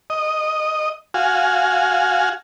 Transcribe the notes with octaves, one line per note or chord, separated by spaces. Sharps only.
D#5
F#4 F5 G#5